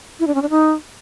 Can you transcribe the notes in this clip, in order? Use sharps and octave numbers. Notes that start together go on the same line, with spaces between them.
E4
D4
C#4
D4
D#4